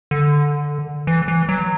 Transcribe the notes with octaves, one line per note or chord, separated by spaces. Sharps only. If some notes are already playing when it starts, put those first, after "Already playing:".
D3
E3
E3
F#3